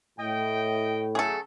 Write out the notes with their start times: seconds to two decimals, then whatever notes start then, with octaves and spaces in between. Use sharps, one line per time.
0.19 A2 D#5 G5
1.15 C#3 F#3 A3 G#4 A4